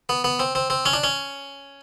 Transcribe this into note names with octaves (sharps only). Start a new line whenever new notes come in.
B3
B3
C4
C4
C4
C#4
D4
C#4